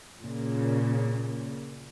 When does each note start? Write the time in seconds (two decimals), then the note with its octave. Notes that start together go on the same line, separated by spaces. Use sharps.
0.20 A#2 C#3